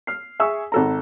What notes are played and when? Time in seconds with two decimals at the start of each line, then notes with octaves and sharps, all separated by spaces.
0.07 F6 C7
0.39 G#4 E5 G#5 C#6 E6
0.72 G#1 A4 A#5